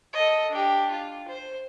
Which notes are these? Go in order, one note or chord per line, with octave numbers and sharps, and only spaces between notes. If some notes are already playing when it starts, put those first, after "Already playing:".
A4 D#5
D4 G4
F4
C5